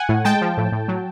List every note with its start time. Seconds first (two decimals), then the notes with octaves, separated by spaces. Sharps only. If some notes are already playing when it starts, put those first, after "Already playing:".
Already playing: F#5 G#5
0.09 A2
0.25 G#3 G5 A5
0.41 F3
0.57 A2
0.72 A2
0.88 F#3